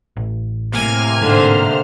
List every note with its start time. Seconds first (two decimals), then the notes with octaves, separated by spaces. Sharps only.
0.17 A1
0.72 A2 C3 A#3 G#5 F6
1.22 G#2 D3 C5